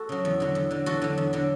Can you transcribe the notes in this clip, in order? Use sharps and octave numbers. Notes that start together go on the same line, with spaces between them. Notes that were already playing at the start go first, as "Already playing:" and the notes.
Already playing: F#4 A4
C#3 F#3
E2
D3 F#3
E2
D3 F#3
E2 F#4 A4
D3 F#3
E2
D3 F#3